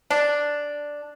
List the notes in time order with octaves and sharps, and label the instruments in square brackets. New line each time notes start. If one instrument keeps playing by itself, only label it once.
[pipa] D4